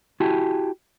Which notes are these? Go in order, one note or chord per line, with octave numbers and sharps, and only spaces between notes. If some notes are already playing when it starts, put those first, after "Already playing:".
E4 F#4 G4 G#5 A5